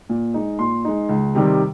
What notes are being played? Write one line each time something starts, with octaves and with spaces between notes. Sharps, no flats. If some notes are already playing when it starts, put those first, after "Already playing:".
A#2
G#3 D#4
A#2 C6
G#3 D#4
C#2
C3 D#3 G3